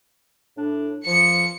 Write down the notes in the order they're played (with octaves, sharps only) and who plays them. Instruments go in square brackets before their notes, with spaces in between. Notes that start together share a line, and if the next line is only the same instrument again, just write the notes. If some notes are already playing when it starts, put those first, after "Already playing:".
[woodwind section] A2 D4
[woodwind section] F3 [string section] C#7